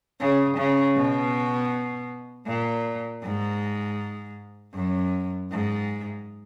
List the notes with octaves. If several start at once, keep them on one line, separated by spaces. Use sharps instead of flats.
C#3
C#3
B2
A#2
G#2
F#2
G#2